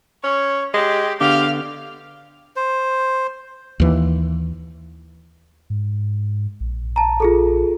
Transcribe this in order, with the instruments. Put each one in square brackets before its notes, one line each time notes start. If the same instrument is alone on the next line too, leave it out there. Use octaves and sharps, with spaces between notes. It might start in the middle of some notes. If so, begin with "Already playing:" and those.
[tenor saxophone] C#4 [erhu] C#5
[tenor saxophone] G#3 [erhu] G4
[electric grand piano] D3 B3 D4 [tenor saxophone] G4 [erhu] F5
[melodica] C5
[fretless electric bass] D#2 E3
[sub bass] G#2
A#1
[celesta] A5 A#5
F4 G#4 A4